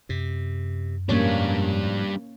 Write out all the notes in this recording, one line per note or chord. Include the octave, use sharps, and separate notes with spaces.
F#2 C3
G#2 B2 F3 G3 A#3 C#4 D4 C#5